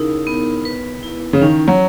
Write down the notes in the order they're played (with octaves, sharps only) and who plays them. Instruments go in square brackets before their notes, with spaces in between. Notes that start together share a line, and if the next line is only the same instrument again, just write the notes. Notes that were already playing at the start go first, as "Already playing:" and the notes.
Already playing: [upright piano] C#3 [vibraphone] D#4 E4 A#4
[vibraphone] B3
B4
E4
[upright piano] C#3
[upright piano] D#3 [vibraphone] C#4
[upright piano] F#3